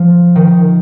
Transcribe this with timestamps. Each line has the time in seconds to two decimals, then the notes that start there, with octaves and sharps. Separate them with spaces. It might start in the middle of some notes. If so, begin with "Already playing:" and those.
Already playing: F3
0.36 D#3